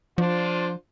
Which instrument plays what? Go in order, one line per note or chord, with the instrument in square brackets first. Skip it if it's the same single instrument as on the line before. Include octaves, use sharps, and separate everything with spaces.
[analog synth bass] F3 [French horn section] D4 F4 C5